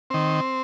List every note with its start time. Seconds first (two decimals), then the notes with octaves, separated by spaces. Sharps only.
0.10 D#3 C4